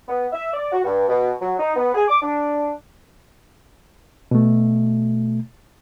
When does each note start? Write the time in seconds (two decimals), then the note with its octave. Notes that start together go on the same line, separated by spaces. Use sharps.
0.08 B3
0.33 E5
0.53 D5
0.72 F#4
0.84 G2
1.09 B2
1.42 F#3
1.59 D#4
1.76 B3
1.95 G#4
2.09 D6
2.22 D4
4.31 B2 A3